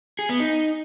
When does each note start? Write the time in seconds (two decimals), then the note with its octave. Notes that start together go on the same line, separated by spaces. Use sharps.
0.19 G#4
0.29 B3
0.40 D#4